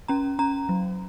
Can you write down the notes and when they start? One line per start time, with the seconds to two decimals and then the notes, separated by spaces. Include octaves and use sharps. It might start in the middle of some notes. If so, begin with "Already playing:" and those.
0.08 C#4 A#5
0.39 C#4 A#5
0.69 F#3